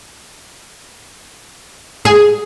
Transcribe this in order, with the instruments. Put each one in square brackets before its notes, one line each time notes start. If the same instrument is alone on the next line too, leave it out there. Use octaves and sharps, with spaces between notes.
[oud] G#4